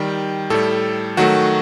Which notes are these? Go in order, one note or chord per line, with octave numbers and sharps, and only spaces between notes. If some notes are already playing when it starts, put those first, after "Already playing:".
Already playing: D#3 G3 G5
A2 G3 A4
D#3 F#3 A3 F#4